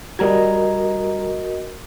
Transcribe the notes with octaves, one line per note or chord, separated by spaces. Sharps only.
G3 F#4 A#4 D#5 A#5 G#6